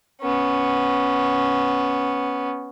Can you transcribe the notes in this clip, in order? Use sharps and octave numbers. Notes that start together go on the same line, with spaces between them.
B3 C#4